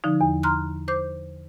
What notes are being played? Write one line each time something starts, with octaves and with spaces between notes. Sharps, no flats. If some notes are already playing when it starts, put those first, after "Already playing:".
D3 F3 D#4
E2
A#5 C6 F6 F#6
C5 D6 G6